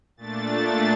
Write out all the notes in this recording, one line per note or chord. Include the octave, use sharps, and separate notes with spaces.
A#2 A3 D4 A6
A6